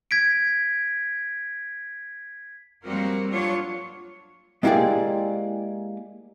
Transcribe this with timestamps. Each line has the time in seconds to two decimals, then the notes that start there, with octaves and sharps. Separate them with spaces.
0.11 G#6 B6 D7
2.84 F#3 G3 A#3 C4 F#4 A#4
3.30 F#3 D4 F4 C#5
4.63 G#3 A#3 E4 G4 G#4 D5